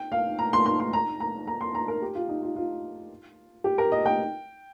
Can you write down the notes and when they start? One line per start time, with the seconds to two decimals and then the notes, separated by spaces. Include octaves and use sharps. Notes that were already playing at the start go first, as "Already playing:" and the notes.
Already playing: G5
0.12 F5
0.39 A#5
0.53 C6
0.66 C6
0.80 C6
0.93 A#5
1.20 A#5
1.47 A#5
1.61 C6
1.75 A#5
1.88 A#4
2.02 G4
2.15 F4
2.29 D#4
2.43 F4
2.56 F4
3.64 G4
3.78 A#4
3.92 D#5
4.06 G5